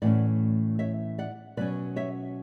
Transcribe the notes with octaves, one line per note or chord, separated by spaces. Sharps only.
A2 E3 A3 C#4 D5 F#5
C#5 E5
D5 F#5
B2 F#3 C#4 B4 D5
C#5 E5